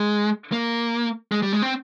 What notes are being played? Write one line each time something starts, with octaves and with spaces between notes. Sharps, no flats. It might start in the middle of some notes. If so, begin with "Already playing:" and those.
Already playing: G#3
A#3
G#3
G3
G#3
C4